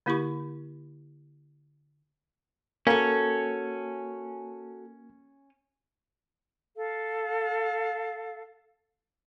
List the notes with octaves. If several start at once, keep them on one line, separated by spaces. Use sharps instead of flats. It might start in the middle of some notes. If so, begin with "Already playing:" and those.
D3 A#3 E4 G4 B5 C#6
A#3 C#4 F#4 A4
A4 F5